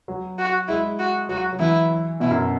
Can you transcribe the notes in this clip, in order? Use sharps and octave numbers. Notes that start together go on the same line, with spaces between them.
F#3
F#4
G#3 E4
F#4
F#3 F#4
F#3
E3 E4
B2 E4
F#2